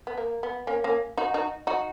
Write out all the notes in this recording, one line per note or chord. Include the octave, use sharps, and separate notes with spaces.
B3
A#3
B3
A#3 C#4
A#3 C#4
D#4 F#4
D#4 F#4
D#4 F#4